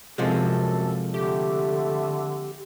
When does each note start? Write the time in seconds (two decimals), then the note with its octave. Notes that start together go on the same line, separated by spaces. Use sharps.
0.18 F#2 C3 F3 G#3 A4
1.14 D3 A3 G4